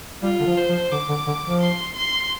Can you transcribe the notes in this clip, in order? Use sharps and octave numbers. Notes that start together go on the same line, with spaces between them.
G3 F4
D3
F3
C5
F3
D3 D6
D3
D3
F3
C6
C6